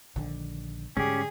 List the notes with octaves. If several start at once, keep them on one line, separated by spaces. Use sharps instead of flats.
A#1 D3 D#3
G#2 D3 G3 C#4 G4 G#4